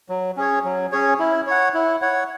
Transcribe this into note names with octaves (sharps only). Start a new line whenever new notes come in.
F#3
C#4 G#4 C#5
F#3
C#4 G#4 C#5
E4
C#5 F#5
E4
C#5 F#5